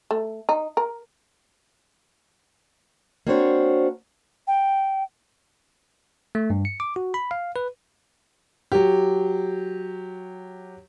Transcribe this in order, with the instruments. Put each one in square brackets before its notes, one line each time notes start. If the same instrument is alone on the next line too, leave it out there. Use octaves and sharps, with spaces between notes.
[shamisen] A3
D#4
A#4
[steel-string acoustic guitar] A#3 C4 D4 F#4 C5 C#5
[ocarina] G5
[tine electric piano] A3
G2
C#7
D6
F#4
B5
F5
B4
[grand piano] F#3 G4